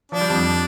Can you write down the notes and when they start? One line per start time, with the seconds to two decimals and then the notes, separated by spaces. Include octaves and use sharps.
0.12 F3 D4
0.21 G3
0.30 F2 F3